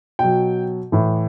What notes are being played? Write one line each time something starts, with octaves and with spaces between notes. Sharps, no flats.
B2 F#3 G5
A2 E3